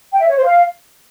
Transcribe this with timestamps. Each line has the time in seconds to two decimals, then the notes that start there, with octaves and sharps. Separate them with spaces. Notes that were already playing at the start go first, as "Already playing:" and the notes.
0.13 G5
0.21 E5
0.28 C#5
0.36 C5
0.44 F5